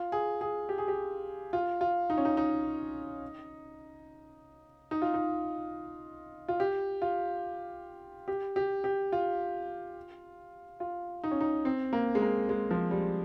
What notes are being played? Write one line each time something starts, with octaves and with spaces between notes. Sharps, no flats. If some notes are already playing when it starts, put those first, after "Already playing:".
Already playing: F4
G#4
G#4
G4
G#4
G4
F4
F4
D#4
C#4
D#4
D#4
D#4
F4
D#4
F4
G4
F4
G4
G4
G4
F4
F4
D#4
C#4
D#4
C4
A#3
G#3
A#3
G#3
F3
G3